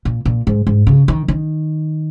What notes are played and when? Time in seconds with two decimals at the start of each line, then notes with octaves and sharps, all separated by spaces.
0.05 A#2
0.25 A#2
0.47 G#2
0.67 G#2
0.87 C#3
1.08 D#3
1.28 D#3